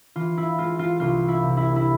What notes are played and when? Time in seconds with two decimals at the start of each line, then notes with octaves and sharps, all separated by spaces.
0.16 E3 F4
0.37 E4
0.58 G#3 F4
0.79 F4
1.00 C2 F4
1.28 E4
1.42 C3
1.57 E4
1.76 E4